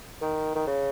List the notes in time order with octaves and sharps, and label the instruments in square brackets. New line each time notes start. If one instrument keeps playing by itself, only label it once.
[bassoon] D#3
D#3
C#3